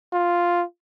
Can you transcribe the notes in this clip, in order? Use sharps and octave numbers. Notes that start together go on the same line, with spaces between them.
F4